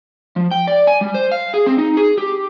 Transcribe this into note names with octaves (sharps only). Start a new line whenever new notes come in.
F3
G5
D5
G#5
G3
C5
F5
G#4
C4
D#4
G#4
G4